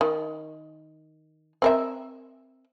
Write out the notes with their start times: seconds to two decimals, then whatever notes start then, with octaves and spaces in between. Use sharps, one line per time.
0.01 D#3
1.62 C4 A#4 E5